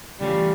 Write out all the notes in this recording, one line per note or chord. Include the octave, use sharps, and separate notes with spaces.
C#3 E3 G3 A3 C#4 F4